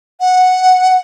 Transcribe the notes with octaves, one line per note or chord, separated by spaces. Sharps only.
F#5